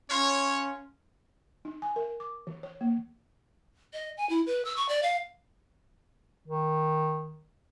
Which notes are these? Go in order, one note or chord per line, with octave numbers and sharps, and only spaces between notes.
C#4 F4 A#4 C#5
D#4
G#5
A#4
D6
E3
C#5
A#3
D#5
G#5
E4
B4
E6
C#6
D5
F5
D#3